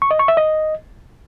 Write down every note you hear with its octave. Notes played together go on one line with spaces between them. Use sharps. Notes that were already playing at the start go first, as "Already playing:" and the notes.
C#6
D#5
C#6
E5
D#5